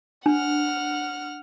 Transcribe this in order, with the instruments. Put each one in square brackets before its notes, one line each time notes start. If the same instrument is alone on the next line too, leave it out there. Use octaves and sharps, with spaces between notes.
[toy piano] D4 [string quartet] F#5 F6